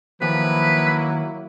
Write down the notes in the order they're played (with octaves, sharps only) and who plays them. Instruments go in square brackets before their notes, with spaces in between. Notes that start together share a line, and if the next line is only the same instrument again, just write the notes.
[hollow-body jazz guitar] D#2 [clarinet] F3 [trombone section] F#3 A#3 E4 [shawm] B4